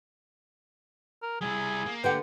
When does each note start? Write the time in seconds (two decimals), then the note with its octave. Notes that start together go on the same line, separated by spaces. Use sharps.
1.22 A#4
1.41 G3 E4 G#4
1.86 A#3
2.04 D3 G4 B4 F#5 G5